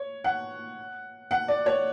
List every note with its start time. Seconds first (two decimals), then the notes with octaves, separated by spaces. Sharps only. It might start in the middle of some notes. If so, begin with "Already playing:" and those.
Already playing: C#5
0.24 F#5
1.31 F#5
1.48 D5
1.66 C#5